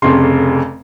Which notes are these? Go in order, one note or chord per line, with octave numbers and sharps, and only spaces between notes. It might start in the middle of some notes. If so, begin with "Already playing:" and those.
F1 F2 C#3 C6